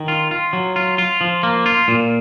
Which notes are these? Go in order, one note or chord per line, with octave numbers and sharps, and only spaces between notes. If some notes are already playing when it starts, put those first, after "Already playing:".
Already playing: D#3
F4
F4
F#3
F4
F4
F3
A#3
F4
A#2